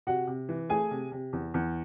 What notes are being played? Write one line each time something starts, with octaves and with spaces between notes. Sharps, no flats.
C3 F#4 F#5
C3
E3
A3 G#4 G#5
C3
C3
E2
E2